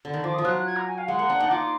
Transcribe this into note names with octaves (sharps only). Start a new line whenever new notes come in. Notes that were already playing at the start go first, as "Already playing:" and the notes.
D3
D#3
F3 D6
F3 D#6
F#3 F#6
F#6
G#6
A#5
G#5
F5
G#3 F#5
A#3
D4
D#4
F4 D6